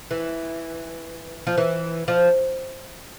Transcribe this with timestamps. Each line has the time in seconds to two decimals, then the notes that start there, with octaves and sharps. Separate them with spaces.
0.11 E3
1.47 F3
1.58 E3
2.08 F3